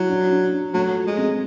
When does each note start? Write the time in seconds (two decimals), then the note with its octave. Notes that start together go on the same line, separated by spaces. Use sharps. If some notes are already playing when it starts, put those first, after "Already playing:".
Already playing: F#3 E4
0.09 D4
0.31 D4
0.52 D4
0.74 F#3 A3
0.96 F3
1.07 G#3
1.18 C4